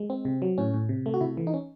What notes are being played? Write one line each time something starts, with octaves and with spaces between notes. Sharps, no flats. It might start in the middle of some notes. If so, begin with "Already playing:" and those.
Already playing: G#3
C4
C3
F#3
A2 C#4
A2
C3
A3
F#4
C3 E4
E3
D#4
C#4